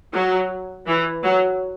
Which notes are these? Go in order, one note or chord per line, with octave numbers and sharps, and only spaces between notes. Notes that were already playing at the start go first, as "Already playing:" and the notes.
F#3
E3
F#3